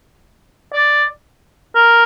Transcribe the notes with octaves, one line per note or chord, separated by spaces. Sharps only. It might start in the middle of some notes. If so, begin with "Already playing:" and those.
D5
A#4